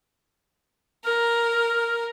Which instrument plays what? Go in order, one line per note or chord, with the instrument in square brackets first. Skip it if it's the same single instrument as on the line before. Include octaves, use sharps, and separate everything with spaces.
[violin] A#4 [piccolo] F6